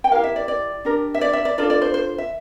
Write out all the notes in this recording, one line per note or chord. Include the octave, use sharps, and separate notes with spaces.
G5
E4 G4 A#4 F5
E5
D5
D5
D4 G4 A#4
E5
D5
E5
D5
D4 F4 A4 D5
D5
C5
C5
E5